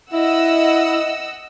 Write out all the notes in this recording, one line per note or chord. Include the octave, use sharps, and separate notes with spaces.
E4 D#5 F#5 E6